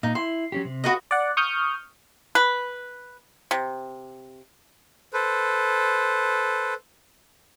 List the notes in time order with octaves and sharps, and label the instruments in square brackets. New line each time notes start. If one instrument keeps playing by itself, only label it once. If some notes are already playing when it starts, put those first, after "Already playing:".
[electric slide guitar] A#2 [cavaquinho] D#4
[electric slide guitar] E4 [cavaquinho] C6
[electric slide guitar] F#3 C#4 G4
C3
[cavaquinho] F#4 B4 D#5
[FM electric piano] D5 F#5
C#6 D#6 F6 G6
[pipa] B4
C3
[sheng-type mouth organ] A4 B4 C5